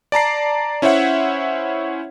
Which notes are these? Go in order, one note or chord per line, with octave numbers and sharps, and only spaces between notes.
D5 A5 A#5 C7
C#4 E4 C5 C#5 E5 F#5